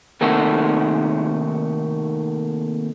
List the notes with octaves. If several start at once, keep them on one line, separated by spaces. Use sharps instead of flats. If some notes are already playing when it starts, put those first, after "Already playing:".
D#2 C3 D#3 A3 F#4 A4